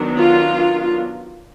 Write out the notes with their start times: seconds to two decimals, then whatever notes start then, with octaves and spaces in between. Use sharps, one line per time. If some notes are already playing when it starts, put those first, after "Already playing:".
Already playing: D#3 F#3 B3 D4
0.17 F4